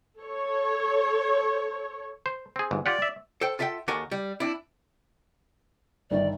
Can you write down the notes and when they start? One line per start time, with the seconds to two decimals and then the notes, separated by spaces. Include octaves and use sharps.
0.19 A4 C#5
2.26 C5
2.56 C4 G#4
2.71 G1 G#2
2.86 F4 G4 D5 F#5
3.02 E5
3.41 A4 C5 G5
3.59 F4 A4 E5 F#5 G5
3.88 D#2 F#4 G4 A4 A#4 G#5
4.11 G3
4.40 C4 D4 E4
6.11 G1 D#3 D5